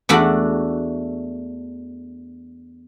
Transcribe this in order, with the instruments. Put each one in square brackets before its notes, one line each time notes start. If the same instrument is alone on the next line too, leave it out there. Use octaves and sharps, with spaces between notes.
[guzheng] E2 A3 D4 F#4